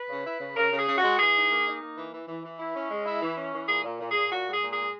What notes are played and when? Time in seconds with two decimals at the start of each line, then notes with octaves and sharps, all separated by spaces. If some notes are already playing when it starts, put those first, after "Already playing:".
Already playing: B4
0.09 C#3
0.25 E4
0.40 C#3
0.56 C#3 A#4
0.72 C#3
0.77 G#4
0.87 C#3
0.98 F#4
1.03 G#3
1.18 E3 G#4
1.35 D#4
1.50 A#3
1.65 D#4
1.81 A#3
1.97 E3
2.13 E3
2.28 E3
2.44 E3
2.59 E4
2.75 C#4
2.90 G#3
3.06 E4
3.22 E3
3.37 C#4
3.52 E3
3.68 A#2 G#4
3.84 A#2
3.99 A#2
4.11 A#2 G#4
4.31 A#2 F#4
4.46 G#3
4.51 G#4
4.62 A#2
4.73 G#3 G#4